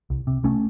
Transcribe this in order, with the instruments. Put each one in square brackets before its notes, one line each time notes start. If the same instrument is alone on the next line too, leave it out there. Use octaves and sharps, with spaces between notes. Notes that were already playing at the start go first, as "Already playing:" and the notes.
[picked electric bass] C2
C3
C2 A3 C#4